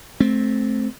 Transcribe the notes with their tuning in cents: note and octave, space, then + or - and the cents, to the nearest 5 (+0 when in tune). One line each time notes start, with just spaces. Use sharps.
A3 -25 C4 +0